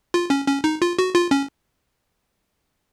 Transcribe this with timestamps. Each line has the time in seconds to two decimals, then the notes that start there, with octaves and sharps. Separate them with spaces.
0.14 F4
0.30 C#4
0.47 C#4
0.64 D#4
0.82 F4
0.99 F#4
1.15 F4
1.31 C#4